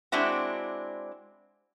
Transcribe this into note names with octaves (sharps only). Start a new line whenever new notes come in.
G#3 C4 D4 E4 F#4